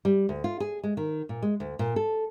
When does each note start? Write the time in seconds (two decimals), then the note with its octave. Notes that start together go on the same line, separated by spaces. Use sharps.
0.05 G3
0.29 D2
0.44 F4
0.60 G#4
0.83 G#3
0.97 D#3
1.29 A#2
1.42 G#3
1.60 D2
1.79 A#2
1.96 A4